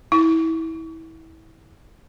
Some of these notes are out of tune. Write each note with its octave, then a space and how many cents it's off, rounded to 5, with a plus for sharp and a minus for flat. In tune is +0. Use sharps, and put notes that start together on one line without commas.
E4 -25